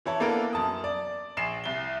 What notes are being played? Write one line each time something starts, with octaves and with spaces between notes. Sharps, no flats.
E3 E4 C#5 A5
A#3 B3 D4 A4 A#4
F#2 A5 D#6
D5
A#1 C7 E7
C2 G7